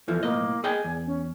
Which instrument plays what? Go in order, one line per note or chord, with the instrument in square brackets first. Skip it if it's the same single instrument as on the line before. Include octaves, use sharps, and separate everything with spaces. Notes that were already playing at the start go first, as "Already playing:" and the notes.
[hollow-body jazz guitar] E2 E3 F3 [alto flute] A4
[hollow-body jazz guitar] B1 A2 D#5 [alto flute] A#3
[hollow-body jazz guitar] G#4 D#5 G5 [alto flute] G#5
[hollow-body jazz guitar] E2
[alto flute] C#4